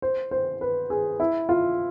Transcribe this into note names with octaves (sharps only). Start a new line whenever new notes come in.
C5
C5
B4
G#4
E4
F4